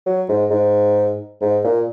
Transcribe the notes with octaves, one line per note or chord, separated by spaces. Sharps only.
F#3
G#2
G#2
G#2
A#2